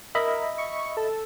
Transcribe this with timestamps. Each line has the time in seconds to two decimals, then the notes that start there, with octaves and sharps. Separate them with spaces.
0.15 A#4 D#5 E5 B5
0.58 C#6
0.97 A4